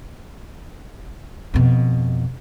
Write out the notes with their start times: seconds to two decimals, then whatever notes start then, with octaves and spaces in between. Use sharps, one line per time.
1.54 F2 B2